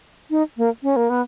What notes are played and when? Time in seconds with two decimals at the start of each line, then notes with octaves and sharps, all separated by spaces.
0.30 D#4
0.57 A#3
0.83 C#4
0.96 A#3
1.10 B3